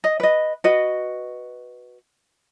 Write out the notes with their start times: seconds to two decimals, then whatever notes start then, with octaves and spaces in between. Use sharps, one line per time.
0.04 D#5
0.20 B4 D#5
0.64 F#4 B4 D#5